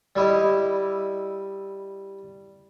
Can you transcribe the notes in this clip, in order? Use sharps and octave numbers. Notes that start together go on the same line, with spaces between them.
G3 E4 D#5